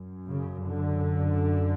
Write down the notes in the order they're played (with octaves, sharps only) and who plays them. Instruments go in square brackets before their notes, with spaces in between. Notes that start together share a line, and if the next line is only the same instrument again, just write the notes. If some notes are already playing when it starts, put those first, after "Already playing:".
Already playing: [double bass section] F#2
C#3
D3